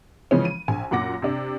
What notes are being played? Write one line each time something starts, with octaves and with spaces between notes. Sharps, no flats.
C#3 E3 F3 G#3 C#4
D#7
A#1 G#5
F#2 A#2 F#5 D6 A#6
C3 D4